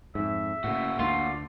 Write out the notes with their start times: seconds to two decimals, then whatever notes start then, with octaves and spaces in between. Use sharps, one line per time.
0.15 F2 G#2 E5
0.64 A2 C#3 A#3 F#4
0.99 D2 A3 D4 F4
1.21 D5